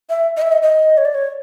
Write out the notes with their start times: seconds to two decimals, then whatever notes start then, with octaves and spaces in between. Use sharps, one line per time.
0.10 E5
0.37 D#5
0.42 E5
0.52 D#5
0.62 D#5
0.97 C#5
1.05 D5
1.14 C#5